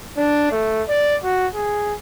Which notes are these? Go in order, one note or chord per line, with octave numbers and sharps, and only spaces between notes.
D4
A3
D5
F#4
G#4